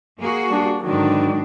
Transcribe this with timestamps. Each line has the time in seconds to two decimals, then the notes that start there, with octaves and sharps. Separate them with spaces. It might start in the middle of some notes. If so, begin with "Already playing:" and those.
0.19 A#3 F#4 G#4
0.49 G3 D4
0.84 G#2 D3 D#3 F#3 D4